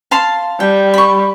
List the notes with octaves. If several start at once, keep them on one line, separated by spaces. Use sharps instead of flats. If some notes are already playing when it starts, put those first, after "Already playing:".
F5 A5 C6
G3 G5
B5 C#6